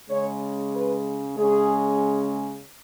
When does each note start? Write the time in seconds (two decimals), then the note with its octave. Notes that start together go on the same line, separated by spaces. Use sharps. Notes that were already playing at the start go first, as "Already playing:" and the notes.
0.10 C#3 G#3 C#4 C#5
0.73 B4
1.37 C#3 G#3 C#4 G#4